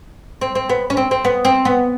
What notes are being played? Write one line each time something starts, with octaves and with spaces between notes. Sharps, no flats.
C4
C4
B3
C#4
C4
C4
B3
C4
B3